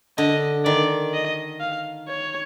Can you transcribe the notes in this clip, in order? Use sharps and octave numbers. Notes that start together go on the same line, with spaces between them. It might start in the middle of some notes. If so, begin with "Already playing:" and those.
D3 D#5
D#3 D5
D#5
F5
C#5